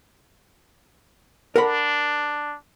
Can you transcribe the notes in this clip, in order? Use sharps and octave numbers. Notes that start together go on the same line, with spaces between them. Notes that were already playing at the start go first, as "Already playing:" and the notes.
D4 A#4 F#5 B5